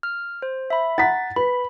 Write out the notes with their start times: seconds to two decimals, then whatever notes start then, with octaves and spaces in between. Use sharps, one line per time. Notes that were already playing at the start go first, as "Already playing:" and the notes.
0.03 F6
0.42 C5
0.70 E5 B5
0.98 F#5 A#5 A6 B6
1.36 B4 B5